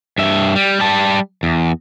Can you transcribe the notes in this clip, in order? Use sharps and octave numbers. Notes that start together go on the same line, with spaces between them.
G2 E5
G3
G3 A5
E2